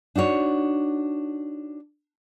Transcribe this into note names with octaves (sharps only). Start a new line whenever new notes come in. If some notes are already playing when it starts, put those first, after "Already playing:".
D4 D#4 F#4 C#5